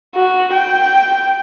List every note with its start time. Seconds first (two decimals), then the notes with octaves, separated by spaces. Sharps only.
0.15 F#4
0.54 G5